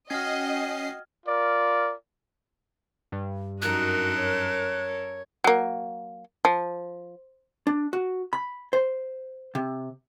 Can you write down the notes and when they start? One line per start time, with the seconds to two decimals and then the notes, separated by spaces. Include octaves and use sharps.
0.10 C#4 F#4 D#5 G5 F6 G#6 C7
1.26 F4 A#4 D5
3.12 G2
3.62 F#2 D#4 F#4 A4 A#4 F#6
4.21 C#5
5.44 F#3 A#3
6.45 F3
7.67 D4
7.93 F#4
8.33 B5
8.73 C5
9.55 C3